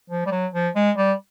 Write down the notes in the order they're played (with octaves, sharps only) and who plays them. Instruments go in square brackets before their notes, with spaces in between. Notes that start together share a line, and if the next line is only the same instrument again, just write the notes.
[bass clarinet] F3
G3
F#3
F3
G#3
G3